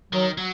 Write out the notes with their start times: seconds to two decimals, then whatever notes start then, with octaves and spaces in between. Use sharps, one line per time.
0.13 D#3 F#3
0.38 F#3